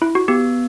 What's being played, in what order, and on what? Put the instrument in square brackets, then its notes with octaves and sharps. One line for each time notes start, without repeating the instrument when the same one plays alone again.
[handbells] E4
F#4
[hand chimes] B3 [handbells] G4